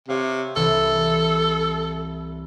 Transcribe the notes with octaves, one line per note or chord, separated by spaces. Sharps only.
C3 C#5 F5
C2 E3 A4